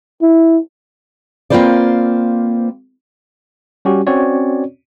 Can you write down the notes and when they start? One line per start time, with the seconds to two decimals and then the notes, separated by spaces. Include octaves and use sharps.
0.22 E4
1.50 A#3 C4 F4 B4 C5 D5
3.85 G3 C#4 F#4 G4
4.07 C4 C#4 F#4 C#5 D5